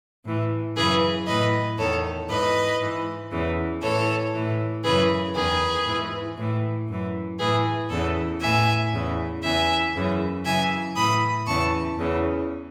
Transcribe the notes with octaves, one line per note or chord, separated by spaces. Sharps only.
A2 E3
F#2 C#3 E3 G#4 B4
A2 E3 B4 D#5
E2 D#3 A4 C#5
G#2 E3 B4 D#5
G#2 E3
E2 C#3 E3
A2 E3 A4 C#5
A2 E3
F#2 C#3 E3 G#4 B4
E2 D#3 G#4 B4
G#2 E3
A2 E3
F#2 E3
A2 E3 G#4 B4
E2 C#3 E3 A4
A2 E3 E5 G#5
E2 C#3 E3
E2 C#3 E3 E5 G#5
F#2 C#3 E3
F#2 C#3 E3 E5 G#5
A2 E3 B5 D#6
E2 C#3 E3 A5 C#6
E2 C#3 E3